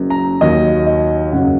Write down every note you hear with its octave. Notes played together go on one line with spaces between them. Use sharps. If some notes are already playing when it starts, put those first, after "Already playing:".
Already playing: F#1 F#2 F#3
A#5
D#2 D#3 F#3 D#5
D#5
F#1 F#2 C#3 F#3 F#5